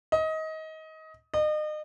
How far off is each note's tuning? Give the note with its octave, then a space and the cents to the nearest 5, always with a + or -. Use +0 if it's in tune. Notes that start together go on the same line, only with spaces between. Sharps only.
D#5 +25
D#5 -35